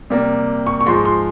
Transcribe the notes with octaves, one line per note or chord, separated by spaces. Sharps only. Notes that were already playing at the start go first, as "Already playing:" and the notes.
C3 G3 A#3
C#6
C#6
G#2 F3 G#3 C6
C6